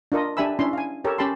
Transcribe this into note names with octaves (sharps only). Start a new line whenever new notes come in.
D4 F4 A#4 D#5
D4 G4 E5 G#5 B5 E6
C#4 D4 E4 C6
F5 G#5
G4 A4 A#4 C#5
C#4 G4 A5 B5 C6